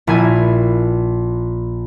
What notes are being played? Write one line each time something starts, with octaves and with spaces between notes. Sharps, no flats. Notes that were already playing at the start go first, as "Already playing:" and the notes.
A#1 E4 G#5 G#6